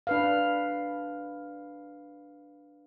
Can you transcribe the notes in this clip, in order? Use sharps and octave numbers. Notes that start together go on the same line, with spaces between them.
D4 B4 F5